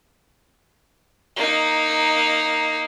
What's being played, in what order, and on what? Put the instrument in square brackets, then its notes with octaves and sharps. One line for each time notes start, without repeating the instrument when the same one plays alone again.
[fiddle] A#3 D#4